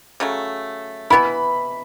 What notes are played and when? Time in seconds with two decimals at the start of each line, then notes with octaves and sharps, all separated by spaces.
0.20 C#3 F#3 A3
1.10 E3 B3 E4 B5